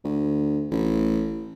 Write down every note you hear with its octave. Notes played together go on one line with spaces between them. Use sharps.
D2
A1